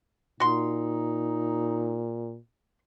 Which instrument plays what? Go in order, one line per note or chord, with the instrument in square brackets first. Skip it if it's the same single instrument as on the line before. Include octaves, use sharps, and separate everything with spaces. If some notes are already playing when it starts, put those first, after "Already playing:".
[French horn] A#2 [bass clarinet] D#4 [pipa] F#4 C6